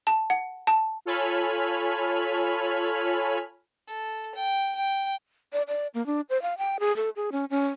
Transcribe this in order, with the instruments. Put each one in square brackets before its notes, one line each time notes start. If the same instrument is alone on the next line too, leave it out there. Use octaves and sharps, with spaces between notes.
[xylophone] A5
F#5
A5
[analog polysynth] F4 A4 C#5 G#5 B5 F6
[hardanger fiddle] A4
G5
G5
[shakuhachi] D5
D5
A#3
D4
C5
F5
G5
G#4
A4
G#4
C#4
C#4